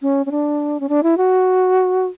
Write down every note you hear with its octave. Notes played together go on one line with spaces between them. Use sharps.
C#4
C#4
D4
C#4
D4
E4
F#4